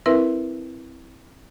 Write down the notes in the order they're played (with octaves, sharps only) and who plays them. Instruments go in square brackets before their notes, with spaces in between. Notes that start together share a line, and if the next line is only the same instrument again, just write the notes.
[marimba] C4 E4 A#4 B4 E5